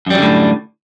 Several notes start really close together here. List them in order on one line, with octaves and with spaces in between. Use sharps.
F#2 G3 F#3 D3 A2